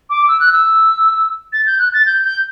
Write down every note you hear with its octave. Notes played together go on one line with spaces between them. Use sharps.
D6
E6
F#6
E6
A6
G6
F#6
A6
G6
G6